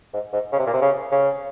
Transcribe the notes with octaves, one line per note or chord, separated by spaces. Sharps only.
G#2
G#2
C#3
C3
A#2
C3
C#3
C#3